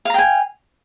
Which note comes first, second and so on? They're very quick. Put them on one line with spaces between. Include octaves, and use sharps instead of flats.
F5 A#5 G5 G#5